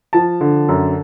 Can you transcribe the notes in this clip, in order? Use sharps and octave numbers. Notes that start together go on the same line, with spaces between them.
F3 A5
D3
F#2